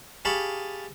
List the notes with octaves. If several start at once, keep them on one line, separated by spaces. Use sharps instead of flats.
G4 G#4 F5 A5 B5 C#6